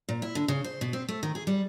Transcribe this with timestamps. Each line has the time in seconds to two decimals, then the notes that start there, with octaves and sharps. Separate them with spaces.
0.09 A#2
0.22 E4
0.35 D3
0.48 C#3
0.64 C5
0.81 B2
0.93 C4
1.09 A3
1.23 D#3
1.35 G#4
1.47 G3